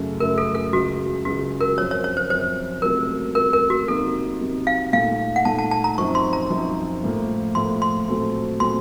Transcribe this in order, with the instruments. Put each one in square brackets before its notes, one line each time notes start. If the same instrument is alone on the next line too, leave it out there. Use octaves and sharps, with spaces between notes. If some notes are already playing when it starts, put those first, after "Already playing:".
Already playing: [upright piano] F#2 C#3 A3
[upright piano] F#2 C#3 A3 [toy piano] A#4
[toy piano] A4
A4
[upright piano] C#2 C#3 F#3 [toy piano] F#4
[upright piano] C#2 C#3 F#3 [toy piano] F#4
[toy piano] A#4
[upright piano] F#2 F3 C4 [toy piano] C#5
[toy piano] C#5
C#5
C5
[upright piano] F#2 F3 C4 [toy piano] C5
[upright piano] C#2 C3 F#3 A3 [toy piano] A#4
[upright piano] C#2 C3 F#3 A3 [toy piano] A#4
[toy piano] A#4
F#4
[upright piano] C3 F#3 A#3 D#4 [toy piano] A4
[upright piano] C3 F#3 A#3 D#4
[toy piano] F5
[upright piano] A#2 A3 D#4 [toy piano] F5
[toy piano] F#5
[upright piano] A#2 A3 D#4 [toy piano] A5
[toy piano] A5
A5
A#5
[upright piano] F#2 F3 C4 D#4 [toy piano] C#6
[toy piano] C6
A#5
[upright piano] F#2 F3 C4 D#4
A2 F3 A#3
[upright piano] A2 F3 A#3 [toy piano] C6
[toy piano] C6
[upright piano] A#2 F#3 A3 C4
[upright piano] A#2 F#3 A3 C4 [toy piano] C6